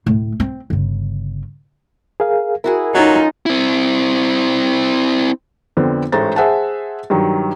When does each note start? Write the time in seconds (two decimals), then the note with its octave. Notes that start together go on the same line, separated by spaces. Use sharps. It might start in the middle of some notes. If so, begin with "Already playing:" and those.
0.06 D1 A2
0.40 C4
0.70 G1 C#3
2.20 G#4 A#4 F5
2.64 E4 F#4 G#4 A#4
2.94 F#3 C#4 D#4 F4 A4
3.46 C4 E4
5.77 F2 D3 B3 C4
6.12 A1 G#2 A3 C5 A#5 A6
6.36 G#4 C5 E5 F#5 G#5 A5
7.10 G2 D#3 F#3